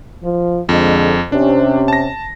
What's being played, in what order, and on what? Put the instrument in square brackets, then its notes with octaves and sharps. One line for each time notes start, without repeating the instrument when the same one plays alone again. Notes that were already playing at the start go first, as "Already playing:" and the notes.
[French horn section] F3
[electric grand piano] F2 [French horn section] D3 G#3
[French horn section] C3 C#4 [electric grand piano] D4
[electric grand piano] A5 A#6